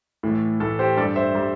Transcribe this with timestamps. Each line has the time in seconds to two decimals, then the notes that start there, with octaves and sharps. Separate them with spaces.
0.23 A2 E3 A3
0.60 A2 E3 A3 A4
0.79 G4 C5
0.97 G2 G3 A4 D5
1.15 C5 E5
1.35 G3